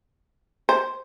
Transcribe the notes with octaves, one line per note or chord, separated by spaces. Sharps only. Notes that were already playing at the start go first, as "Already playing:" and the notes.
C5